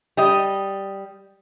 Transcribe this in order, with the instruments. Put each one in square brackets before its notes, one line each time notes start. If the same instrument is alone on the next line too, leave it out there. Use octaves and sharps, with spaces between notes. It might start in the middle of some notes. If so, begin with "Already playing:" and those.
[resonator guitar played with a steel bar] G3 D#5